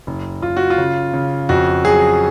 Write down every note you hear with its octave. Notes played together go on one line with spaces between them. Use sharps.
F#1
F#1 F4
F#4
F4
C#3
C#3
F2 F#4
F#3 G#4